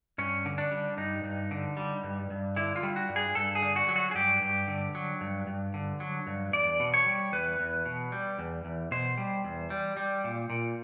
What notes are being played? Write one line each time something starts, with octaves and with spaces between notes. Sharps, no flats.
G2 C#4
D3
D4
G3
G2 D#4
G2
D3
G3
G2
G2
D3 E4
F4
G3
F#4
G2
G#4
G2 A4
G#4
D3
F#4
F#3
F#4
G#4
G2 G4
G2
D3
F#3
G2
G2
D3
F#3
G2
E2 D5
B2
C#5
G3
E2 B4
E2
B2
G3
E2
E2
B2 C5
G3
E2
G3
G3
A#2
A#2